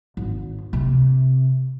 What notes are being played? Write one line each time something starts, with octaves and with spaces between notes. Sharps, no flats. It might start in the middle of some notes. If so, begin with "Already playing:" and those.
G#1
C3